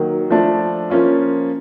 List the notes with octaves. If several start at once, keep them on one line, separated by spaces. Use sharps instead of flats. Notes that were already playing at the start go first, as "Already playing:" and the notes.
Already playing: D#3 F#3 A#3
F3 A3 D4
F3 A#3 C#4 F4